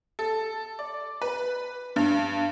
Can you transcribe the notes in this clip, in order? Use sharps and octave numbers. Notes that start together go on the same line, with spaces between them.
A4
D5
B4
G2